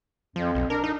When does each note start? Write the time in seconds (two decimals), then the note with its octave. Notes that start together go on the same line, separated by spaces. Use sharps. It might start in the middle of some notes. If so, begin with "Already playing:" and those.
0.36 F2 F3
0.55 B1
0.70 D4 A#4
0.84 D#4